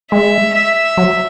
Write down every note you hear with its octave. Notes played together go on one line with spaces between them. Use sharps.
G#3 E5
E5
F#3